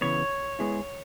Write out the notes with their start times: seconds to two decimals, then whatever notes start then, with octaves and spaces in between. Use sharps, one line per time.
0.01 C#3 E3 B3 C#5
0.59 G#3 B3 E4 G#4